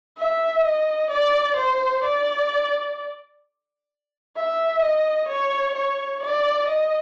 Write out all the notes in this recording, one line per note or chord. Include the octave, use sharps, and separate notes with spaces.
E5
D#5
D5
C5
D5
E5
D#5
C#5
C#5
D5
D#5